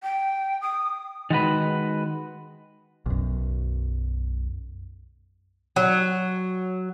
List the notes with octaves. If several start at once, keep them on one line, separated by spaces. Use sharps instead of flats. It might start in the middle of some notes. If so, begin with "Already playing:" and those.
G5
D#6
D#3 G#3 F#4 B4
B1 F#2
F#3